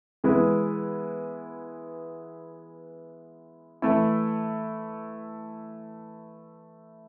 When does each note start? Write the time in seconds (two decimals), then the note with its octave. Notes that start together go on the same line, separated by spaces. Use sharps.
0.24 E3 G#3 B3 E4
3.82 E3 A3 E4